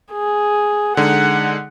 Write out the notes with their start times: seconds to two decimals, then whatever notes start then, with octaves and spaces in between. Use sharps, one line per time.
0.13 G#4
0.97 D3 G#3 D#4 F#5